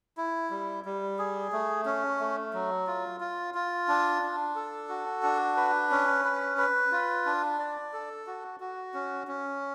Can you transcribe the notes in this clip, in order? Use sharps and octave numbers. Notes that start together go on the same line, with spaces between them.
E4
G3
G3
G#4
A3
C#4
A3
F#3
F4
F4
F4
D4
D4
A4
F#4
D4
B4
C#4
B4
B4
F4
D4
D5
A4
F#4
F#4
C#4
C#4